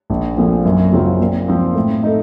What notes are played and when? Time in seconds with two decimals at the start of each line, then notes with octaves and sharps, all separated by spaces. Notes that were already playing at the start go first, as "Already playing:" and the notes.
0.10 A#1
0.37 A#2 F3 A3 C4
0.65 F#2
0.93 C#3 F#3 C4 F4
1.20 A#2
1.48 F3 C4
1.75 A2
2.03 A3 D#4